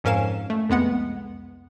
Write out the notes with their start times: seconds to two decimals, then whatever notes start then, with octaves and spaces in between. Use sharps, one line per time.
0.04 F2 G#2 C#4 A#4 F5 E7
0.50 A3
0.69 C2 F2 G#3 B3 F#5